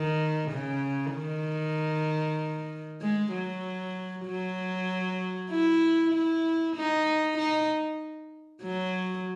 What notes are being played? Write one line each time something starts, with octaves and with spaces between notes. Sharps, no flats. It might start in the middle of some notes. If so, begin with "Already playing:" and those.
Already playing: D#3
C#3
D#3
G#3
F#3
F#3
E4
E4
D#4
D#4
F#3